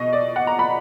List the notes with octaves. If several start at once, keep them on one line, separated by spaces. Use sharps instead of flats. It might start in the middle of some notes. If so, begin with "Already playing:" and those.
Already playing: B2 D#5
D5
F#5
A#5
B5